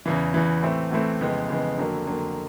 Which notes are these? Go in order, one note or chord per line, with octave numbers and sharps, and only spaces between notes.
E2 C#3 E3
E2 C#3 E3
A2 E3 A3 C4
A2 E3 A3 C4
F2 C#3 E3 G#3 B3
F2 C#3 E3 G#3 B3
F2 D3 F#3 A#3
F2 D3 F#3 A#3